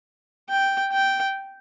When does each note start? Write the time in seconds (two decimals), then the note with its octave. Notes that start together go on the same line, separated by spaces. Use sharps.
0.49 G5
0.92 G5